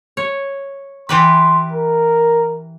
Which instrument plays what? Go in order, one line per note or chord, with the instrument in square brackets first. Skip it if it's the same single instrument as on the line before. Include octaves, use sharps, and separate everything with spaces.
[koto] C#5
[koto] E3 G4 B4 [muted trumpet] C6
[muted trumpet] A#4